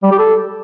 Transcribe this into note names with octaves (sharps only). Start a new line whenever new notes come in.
G3
G4
A4